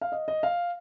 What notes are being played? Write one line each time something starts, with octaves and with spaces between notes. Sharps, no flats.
F5
D#5
D#5
F5